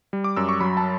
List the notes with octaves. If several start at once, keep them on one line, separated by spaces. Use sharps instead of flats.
G3
D6
F#2 E6
C#6
F#3 B5
A5